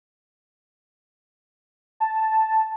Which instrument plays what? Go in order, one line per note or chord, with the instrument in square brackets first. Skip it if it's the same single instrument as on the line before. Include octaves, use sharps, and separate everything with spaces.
[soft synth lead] A5